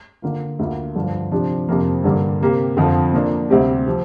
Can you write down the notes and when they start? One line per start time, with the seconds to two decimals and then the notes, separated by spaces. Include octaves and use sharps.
0.22 D3 A#3 F4
0.59 D2 D3 A#3 F4
0.95 G2 D3 F3 D4 F4
1.32 C3 F3 D4 G4
1.69 F2 C3 F3 A#3
2.04 G2 D3 A#3 G4
2.41 C3 A#3 G4
2.77 F2 D3 F3 C4 F4
3.14 A#2 A#3 D4
3.50 D2 C3 G3 C4 G4
3.86 F3 C4 G4